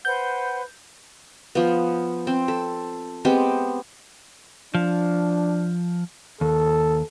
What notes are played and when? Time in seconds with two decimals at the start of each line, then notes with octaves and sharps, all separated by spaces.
0.05 B4 C5 F#5 G6
1.55 F3 B3
2.27 C4
2.48 A4
3.25 G#3 B3 C4 G4
4.75 F3 D4
6.41 D#2 A4